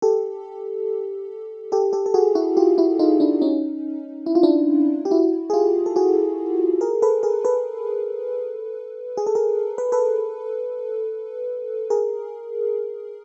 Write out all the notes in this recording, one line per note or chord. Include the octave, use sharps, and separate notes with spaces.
G4 A4
G4 A4
G4 A4
A4
F#4 G#4
E4 F#4
F4 G4
E4 F#4
D#4 F4
D4 E4
C#4 D#4
E4
F4
D4 E4
G4
E4 F#4
G#4
F4 G4
A4
F#4 G#4
G#4 A#4
A4 B4
G#4 A#4
A4 B4
G#4
A4
G#4 A#4
B4
A4 B4
G#4 A#4